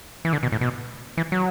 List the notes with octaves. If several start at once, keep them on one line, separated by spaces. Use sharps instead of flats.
E3
D3
B2
A2
B2
E3
F#3